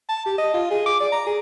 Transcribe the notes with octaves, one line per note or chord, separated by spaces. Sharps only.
A5
G4
D#5
F4
G#4
D6
D5
A#5
G#4